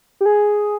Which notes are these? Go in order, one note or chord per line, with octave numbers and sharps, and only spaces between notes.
G4
G#4